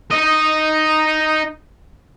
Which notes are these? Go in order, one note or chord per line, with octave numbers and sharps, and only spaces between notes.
D#4 D#5